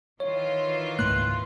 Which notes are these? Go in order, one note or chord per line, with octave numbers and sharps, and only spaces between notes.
D#3 E3 F4 C#5
C#2 G#2 A#3 C6 F#6